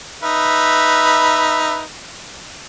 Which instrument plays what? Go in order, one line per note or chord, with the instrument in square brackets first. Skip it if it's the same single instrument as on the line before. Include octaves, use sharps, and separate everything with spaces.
[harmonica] D#4 B4 E5